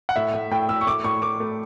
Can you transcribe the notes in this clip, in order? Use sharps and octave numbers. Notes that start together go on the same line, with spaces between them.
F#5
A2 E5
A2
A2 G5
A2 E6
C#6
A2 D6
A2 C#6
A2 D6
A3